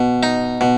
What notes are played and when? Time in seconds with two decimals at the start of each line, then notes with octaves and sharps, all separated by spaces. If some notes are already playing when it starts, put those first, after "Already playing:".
Already playing: B2
0.23 D#4
0.61 B2